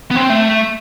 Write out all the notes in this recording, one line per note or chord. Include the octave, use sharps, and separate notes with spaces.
B3
C4
A3